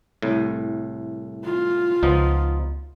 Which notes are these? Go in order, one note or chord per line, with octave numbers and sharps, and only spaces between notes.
C2 A2
F4
C#2 F3 B3 D#4